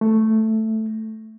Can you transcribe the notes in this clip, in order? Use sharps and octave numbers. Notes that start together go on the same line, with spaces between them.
A3